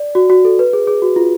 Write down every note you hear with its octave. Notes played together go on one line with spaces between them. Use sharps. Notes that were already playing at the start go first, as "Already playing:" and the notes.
Already playing: D5
F#4
F#4
A4
B4
G#4
G#4
F#4
F4